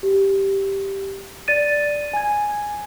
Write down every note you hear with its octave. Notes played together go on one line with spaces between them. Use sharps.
G4
D5 A6 D#7
G#5 G#6